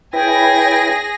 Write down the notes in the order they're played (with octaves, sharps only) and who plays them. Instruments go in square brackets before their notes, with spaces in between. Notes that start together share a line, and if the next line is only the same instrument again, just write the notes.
[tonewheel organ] E4 B4 [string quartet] G#4 A#6 [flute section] C#5 G5